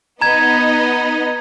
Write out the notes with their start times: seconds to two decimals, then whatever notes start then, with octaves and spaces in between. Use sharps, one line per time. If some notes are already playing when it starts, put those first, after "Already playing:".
0.21 B3 D#4 D#5 A#5 G#6